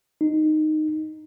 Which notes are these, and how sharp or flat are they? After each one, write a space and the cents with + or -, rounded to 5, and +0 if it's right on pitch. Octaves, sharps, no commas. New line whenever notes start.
D#4 -10